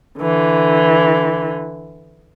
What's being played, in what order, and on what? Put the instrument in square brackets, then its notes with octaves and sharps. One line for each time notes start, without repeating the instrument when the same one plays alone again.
[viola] D3 E3